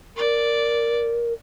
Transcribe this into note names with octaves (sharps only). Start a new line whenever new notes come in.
A#4 D5